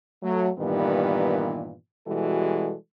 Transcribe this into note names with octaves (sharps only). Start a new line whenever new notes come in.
F#3 A3
G2 A#2 D#3 E3 G3 B3
B2 E3 G3 G#3 F#4 A4